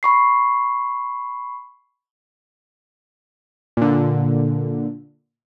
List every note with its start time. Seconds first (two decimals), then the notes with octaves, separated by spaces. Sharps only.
0.03 B5 C#6 C7
3.77 A#2 D3